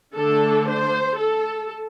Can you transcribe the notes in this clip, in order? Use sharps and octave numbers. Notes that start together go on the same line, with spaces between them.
D3 A3 D4 A4
C5
A4